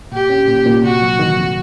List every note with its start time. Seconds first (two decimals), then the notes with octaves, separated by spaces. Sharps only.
0.12 A#2 G4
0.30 C#4
0.48 A#2
0.66 A#2
0.83 C3 F#4
1.02 F#3
1.19 D#3
1.37 F2